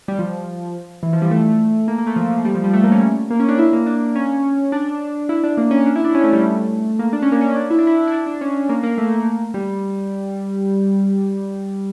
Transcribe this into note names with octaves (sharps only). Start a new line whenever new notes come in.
G3
F3
E3
F3
G3
A3
A#3
A#3
A3
F3
F3
G3
F3
G3
A3
A#3
C#4
A#3
C#4
D4
E4
A#3
D4
C#4
D4
E4
D4
A#3
C#4
D4
E4
D4
C#4
A3
G3
A3
A#3
D4
C#4
A#3
C#4
D4
E4
D4
E4
E4
D4
D4
C#4
A#3
A#3
A3
G3